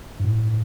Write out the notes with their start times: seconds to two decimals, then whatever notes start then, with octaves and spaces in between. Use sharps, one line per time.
0.20 G2
0.24 A2